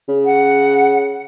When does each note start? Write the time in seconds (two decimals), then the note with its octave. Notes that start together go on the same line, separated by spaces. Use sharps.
0.09 C#3
0.25 F#5